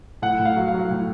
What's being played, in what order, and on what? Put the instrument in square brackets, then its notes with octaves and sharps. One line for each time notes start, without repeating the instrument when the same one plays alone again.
[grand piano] A2 F#5
A2
F5
F#3
F5
F#3
A2